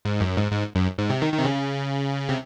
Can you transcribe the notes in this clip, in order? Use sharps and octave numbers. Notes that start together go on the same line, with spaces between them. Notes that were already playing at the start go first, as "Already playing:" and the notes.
G#2
F#2
G#2
G#2
F#2
G#2
C3
D#3
D#3
C3
C#3
C3